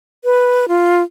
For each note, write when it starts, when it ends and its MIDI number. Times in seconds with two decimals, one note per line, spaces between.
0.24 0.66 71
0.68 1.03 65